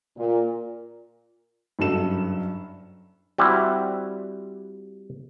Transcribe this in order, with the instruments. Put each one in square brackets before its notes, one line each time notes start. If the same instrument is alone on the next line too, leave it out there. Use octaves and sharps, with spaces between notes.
[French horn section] A#2
[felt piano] F#1 G2 F#3 A4 E7
[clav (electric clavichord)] G3 C4 E4 F#4